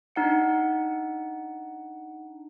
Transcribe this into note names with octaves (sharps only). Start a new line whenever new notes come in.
D4 D#4 F#5 C#7